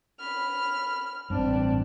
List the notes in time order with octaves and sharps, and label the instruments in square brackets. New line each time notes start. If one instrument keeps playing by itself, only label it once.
[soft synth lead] B5 [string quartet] F6
[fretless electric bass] A1 G2 [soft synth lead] C4 [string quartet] D4